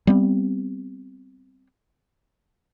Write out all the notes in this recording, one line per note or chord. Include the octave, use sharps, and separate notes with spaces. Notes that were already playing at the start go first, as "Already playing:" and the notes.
G3 B3 C4